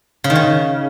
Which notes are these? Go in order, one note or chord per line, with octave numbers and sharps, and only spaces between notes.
C#3
D#3
C#3